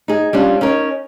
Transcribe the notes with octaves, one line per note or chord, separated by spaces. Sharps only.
D#4 G#4
G3 C#4 D4 F4
C#4 D#4 A#4 C#5